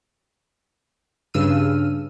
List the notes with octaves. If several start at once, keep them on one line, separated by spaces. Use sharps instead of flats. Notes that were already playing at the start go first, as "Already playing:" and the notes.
G2 C#3 E6 F6 D#7